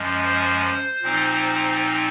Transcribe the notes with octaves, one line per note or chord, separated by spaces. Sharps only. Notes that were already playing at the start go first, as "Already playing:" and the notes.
Already playing: F#2 F3 G#3
C5
A#2 F3 C4 D#4